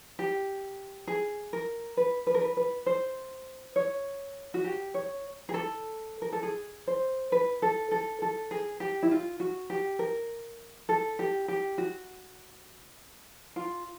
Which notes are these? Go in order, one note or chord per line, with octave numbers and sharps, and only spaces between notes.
G4
G#4
A#4
B4
B4
A#4
B4
B4
C5
C#5
F#4
G4
C#5
G#4
A4
A#4
A4
G#4
C5
B4
A4
A4
A4
G#4
G4
E4
F4
F#4
G4
A#4
A4
G4
G4
F#4
F4